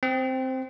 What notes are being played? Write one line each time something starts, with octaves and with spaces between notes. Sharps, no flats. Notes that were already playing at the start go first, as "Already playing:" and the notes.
C4